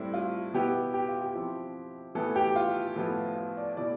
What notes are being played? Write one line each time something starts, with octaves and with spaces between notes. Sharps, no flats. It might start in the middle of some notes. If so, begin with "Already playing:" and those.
Already playing: A2 G3 C4 E4
F4
B2 B3 E4 G4
G4
F4
G4
F3 C4 E4
A2 E3 B3 A4
G4
F4
A2 F3 B3 E4
F4
D5
B2 A3 E4 D5